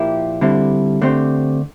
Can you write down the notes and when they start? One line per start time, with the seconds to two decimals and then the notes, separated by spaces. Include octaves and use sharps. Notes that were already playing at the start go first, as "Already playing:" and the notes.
Already playing: A#2 F3 A#3 E4 G4
0.41 D3 G3 C4 E4 A4
1.02 D3 A3 C4 G4 C5